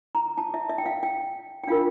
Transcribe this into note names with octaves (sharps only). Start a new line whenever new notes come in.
A#5
A5
E5
E5
G5
F5
G5
G5
D4 F4 A#4 F5